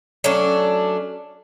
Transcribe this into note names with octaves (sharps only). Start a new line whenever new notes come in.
F#3 A3 C#4 D4